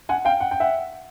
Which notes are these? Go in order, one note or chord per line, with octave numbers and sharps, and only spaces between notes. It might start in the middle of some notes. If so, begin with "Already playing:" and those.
F#5 G#5
F5 G5
F#5
G5
E5 F#5